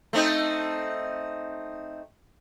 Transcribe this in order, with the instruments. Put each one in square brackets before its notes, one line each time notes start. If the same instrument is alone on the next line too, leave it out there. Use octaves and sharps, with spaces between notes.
[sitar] A3 C4 D#4